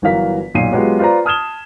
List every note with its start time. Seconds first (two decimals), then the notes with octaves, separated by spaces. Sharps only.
0.02 G1 E3 F#3 A#4 F5 B6
0.54 B1 A#2 C7 D#7
0.72 F#3 G#3 B3 F4 G4
0.99 F4 B4 C5 D5 A#5
1.25 A5 D#6 F6 G#6 E7 G7